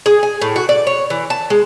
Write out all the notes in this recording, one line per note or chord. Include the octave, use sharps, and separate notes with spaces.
G#4
G#5
A2
F#4
D5
C#5
E3
A5
G#3